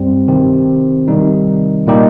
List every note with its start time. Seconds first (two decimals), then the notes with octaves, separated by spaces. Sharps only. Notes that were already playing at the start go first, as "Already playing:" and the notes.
Already playing: G2 G3 C4
0.28 C3 D#3 C4 G4
1.08 C3 D#3 G3 D#4
1.87 A#2 G3 A#3 D#4 G4